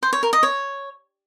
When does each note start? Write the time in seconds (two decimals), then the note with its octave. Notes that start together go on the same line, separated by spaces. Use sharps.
0.03 C5
0.13 C#5
0.23 A#4
0.33 D#5
0.43 C#5